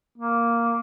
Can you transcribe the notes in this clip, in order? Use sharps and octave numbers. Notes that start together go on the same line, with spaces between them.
A#3